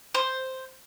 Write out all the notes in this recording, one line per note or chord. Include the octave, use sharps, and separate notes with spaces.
C5